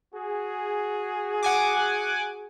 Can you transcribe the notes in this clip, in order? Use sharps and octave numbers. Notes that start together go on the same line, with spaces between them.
F#4 G#4
F#5 G#5 D6